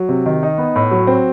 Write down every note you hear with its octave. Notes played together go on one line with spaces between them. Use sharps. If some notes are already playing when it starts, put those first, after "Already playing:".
Already playing: F#3
C3
D#3
D#4
B3
A2
F#3
C4